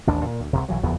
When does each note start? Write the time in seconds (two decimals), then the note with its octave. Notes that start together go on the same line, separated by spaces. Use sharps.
0.07 A1 D#2 D4
0.25 A#2
0.40 D2
0.53 C2 G2 C3
0.69 B1 E3 F#3
0.83 F#1 E2 F3 B3